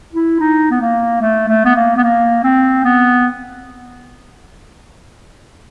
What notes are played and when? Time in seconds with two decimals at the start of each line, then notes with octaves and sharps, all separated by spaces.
0.13 E4
0.40 D#4
0.71 B3
0.81 A#3
1.21 A3
1.48 A3
1.65 B3
1.76 A#3
1.96 B3
2.03 A#3
2.44 C4
2.85 B3